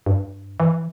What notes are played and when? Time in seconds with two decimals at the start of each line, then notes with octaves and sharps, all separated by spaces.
0.06 G2
0.60 E3